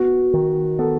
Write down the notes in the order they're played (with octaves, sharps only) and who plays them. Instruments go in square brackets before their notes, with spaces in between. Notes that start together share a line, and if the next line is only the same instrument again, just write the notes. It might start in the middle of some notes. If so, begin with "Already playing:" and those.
Already playing: [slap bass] B3 [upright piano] F#4
[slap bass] D#3
[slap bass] B3 [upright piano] A4